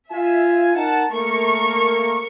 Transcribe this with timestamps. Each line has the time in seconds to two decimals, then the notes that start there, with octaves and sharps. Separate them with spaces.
0.12 F4 E5 G#5
0.75 D#4 A#4 F#5 A5
1.12 A3 A#3 A#4 C#6